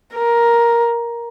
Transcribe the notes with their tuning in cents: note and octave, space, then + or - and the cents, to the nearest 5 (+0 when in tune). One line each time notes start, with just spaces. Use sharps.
A#4 +10